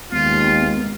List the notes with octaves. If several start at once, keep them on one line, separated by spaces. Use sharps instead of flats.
D#2 G#3 B3 F4